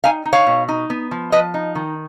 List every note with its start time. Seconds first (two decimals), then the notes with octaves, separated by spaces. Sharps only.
0.04 D#4 F5 G#5
0.25 D#4
0.33 C#5 F5
0.47 B2
0.68 D#4
0.90 B3
1.11 F3
1.32 F3 B4 D#5
1.54 D#4
1.75 D#3